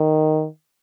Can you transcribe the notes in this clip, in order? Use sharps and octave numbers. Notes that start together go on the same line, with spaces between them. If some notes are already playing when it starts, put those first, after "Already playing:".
Already playing: D#3